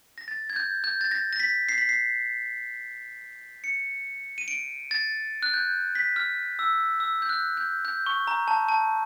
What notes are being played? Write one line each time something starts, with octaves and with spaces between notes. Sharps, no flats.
A#6
A6
G#6
G6
G6
A6
A#6
A#6
B6
C7
B6
C7
C#7
D#7
D7
A6
F#6
G6
B6
F6
E6
E6
G6
F#6
G6
G6
C#6
A#5
A5
A5